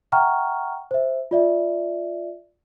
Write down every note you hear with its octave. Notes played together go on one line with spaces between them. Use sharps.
E5 F#5 G5 A#5 C#6 F6
C5 E5
F4 D5 E5